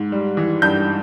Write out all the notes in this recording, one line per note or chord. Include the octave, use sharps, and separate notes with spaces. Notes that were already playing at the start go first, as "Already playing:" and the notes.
Already playing: G#2
G3
E3
G2 G6